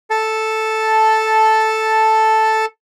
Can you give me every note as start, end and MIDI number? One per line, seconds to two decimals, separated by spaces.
0.10 2.65 69
0.10 2.65 81